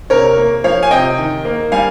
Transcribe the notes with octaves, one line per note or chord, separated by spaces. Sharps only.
C3 A#4 C#5
A#3
F3 C#5 F5
G#5
C3 D#5 G5
D#3
A#3
G3 F5 G#5